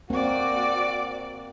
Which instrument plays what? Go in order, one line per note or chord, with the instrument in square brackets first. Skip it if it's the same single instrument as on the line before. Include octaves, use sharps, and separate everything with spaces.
[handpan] A#3 C4 [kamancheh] F#4 D5